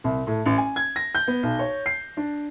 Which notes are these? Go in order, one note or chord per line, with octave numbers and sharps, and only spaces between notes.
C2
A2
A1
G#5
G#6
A#6
G6
B3
B1
C#5
C7
D4